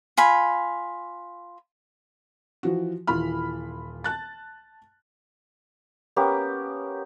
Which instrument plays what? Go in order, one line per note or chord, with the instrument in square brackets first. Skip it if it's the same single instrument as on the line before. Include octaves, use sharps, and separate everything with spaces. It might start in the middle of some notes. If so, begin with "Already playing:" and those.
[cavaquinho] F4 G#5 B5
[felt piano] E3 F3 F#4
D#1 E3 F4 B5 F6
A5 F#6 A6
[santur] A#3 B3 C#4 G4